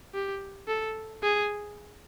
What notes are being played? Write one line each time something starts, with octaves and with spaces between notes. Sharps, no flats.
G4
A4
G#4